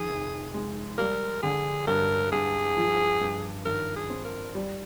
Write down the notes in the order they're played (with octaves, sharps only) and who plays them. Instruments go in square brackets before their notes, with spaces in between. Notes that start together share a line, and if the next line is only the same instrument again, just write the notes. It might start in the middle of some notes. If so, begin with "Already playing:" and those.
Already playing: [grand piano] F2 D#3 [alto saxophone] G#4
[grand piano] F1
G#3
[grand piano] G3 [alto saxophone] A#4
[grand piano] D3 [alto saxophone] G#4
[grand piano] G2 [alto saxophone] A#4
[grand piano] G2 [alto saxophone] G#4
[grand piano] F3
G2
[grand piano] G#1 [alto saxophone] A#4
[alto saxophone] G#4
[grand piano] C4
[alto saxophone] A#4
[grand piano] G3